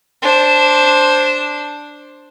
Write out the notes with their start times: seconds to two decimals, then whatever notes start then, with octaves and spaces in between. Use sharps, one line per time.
0.22 D4 C5